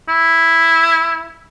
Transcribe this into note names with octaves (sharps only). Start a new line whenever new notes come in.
E4